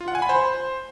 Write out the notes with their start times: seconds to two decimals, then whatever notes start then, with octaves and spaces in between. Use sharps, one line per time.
0.01 F4
0.08 F#5
0.15 G#5
0.22 B5
0.29 C5